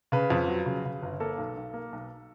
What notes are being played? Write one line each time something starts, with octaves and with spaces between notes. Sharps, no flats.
C#3 B4
F2
F#3
C#3
C#3
G1
A#3 A4
B1
B1
A#3
B1